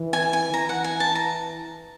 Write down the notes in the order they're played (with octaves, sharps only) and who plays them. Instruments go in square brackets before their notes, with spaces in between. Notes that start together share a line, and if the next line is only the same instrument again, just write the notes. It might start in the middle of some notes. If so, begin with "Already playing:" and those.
Already playing: [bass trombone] E3
[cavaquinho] G#5
G#5
[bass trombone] E3 [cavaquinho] A#5
[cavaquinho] F#5
G#5
A5
A#5